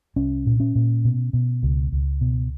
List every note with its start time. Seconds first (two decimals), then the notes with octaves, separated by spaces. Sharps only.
0.16 C2 C#4
0.46 A#2
0.60 C#4
0.75 A#2
1.05 B2
1.33 B2
1.63 C#2
1.92 C#2
2.21 B2